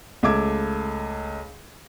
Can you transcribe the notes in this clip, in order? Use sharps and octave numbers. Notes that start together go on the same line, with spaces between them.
C#2 A3 A4 D6 E6 G#6